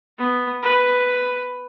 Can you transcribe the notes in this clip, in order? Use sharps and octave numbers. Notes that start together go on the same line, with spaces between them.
B3
B4